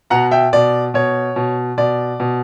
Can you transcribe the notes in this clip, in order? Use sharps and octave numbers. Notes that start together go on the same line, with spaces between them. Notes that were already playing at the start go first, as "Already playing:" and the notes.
B2 F#5 A#5
E5 G5
B2 D5
B2 C#5
B2
B2 D5
B2